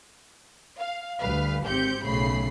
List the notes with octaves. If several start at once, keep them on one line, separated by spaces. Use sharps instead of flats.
F5
D2 G3 B4 F5
G#1 C4 G4 G6 C#7
B1 A2 C#3 B5 C7